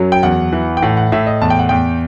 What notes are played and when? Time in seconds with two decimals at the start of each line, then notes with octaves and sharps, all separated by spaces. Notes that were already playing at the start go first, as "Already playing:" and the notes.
Already playing: F#2 F#3
0.12 G5
0.23 E2 F#5
0.52 E3
0.77 G5
0.82 A2 F#5
0.97 F#5
1.12 A2 E5
1.27 D#5
1.41 E2 A5
1.50 G5
1.59 F#5
1.69 E2 G5